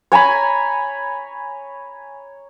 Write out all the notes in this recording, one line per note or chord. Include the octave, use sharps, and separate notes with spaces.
C#5 G#5 A#5 B5